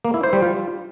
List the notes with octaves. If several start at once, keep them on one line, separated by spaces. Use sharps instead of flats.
A#3
E4
C5
G3
F4